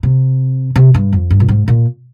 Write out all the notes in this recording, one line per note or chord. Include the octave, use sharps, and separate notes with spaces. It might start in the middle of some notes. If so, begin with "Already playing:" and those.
C3
C3
G2
F2
G2
A#2
G#2
A#2